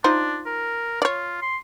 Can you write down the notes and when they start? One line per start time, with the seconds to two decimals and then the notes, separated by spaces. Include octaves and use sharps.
0.04 D4 D#4 F4 C5
0.46 A#4
1.02 F4 C#5 D5
1.42 C6